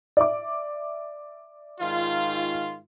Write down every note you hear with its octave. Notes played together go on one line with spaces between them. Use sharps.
D5 E5 D6
G#2 D#3 F4